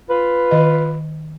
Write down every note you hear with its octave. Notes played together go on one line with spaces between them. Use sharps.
F4 B4
D#3 D#5